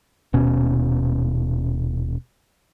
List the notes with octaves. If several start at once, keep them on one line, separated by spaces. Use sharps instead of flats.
D#1 B2 C#4